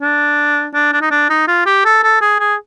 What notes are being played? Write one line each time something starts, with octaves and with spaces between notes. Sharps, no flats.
D4
D4
D4
D#4
D4
D#4
F4
G4
A4
A4
G#4
G#4